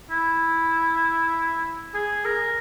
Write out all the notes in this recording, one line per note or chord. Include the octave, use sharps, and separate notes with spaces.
E4
G#4
A#4